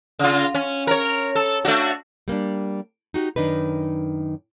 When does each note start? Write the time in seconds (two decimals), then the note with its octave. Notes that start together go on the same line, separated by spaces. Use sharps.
0.19 C#3 F4
0.54 C#4
0.87 A#4 C#5
1.35 A4
1.65 A3 D4 F#4
2.28 G3 A#3 C4 D4
3.14 D#4 F#4 G4
3.36 F#2 D#3 D4 D#4 B4